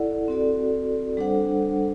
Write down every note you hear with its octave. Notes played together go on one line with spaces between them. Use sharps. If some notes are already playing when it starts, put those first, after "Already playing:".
Already playing: E4 A4 D5 F#5
C4 F#4 A4 D5
G3 D4 A4 C5 F#5